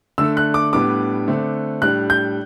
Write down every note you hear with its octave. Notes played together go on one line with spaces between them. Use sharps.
D3 A3 D4 E6
F#6
D6
A2 G3 B3 D4 D6
D3 A3 C4
A2 G3 D4 F#6
G6